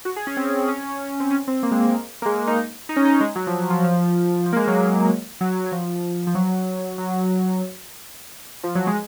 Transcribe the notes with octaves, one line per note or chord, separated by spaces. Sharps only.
F#4
G#4
C#4
C4
C#4
C4
C#4
C4
A#3
G#3
A#3
A#3
G#3
A#3
D#4
D#4
C#4
D#4
G#3
F#3
F3
F3
F3
F3
A#3
G#3
F#3
F#3
F#3
F3
F3
F#3
F#3
F3
F#3
G#3